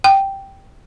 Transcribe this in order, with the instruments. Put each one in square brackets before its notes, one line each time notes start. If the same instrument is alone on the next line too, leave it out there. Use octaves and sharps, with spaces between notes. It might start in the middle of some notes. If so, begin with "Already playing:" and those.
[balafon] G5